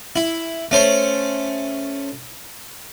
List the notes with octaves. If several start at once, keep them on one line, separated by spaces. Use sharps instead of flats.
E4
A3 C#4 C5